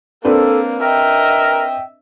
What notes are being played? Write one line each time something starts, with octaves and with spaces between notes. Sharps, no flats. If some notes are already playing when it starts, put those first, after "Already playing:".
A#3 C4 D4 A4 B4
A#4 D#5 E5 G5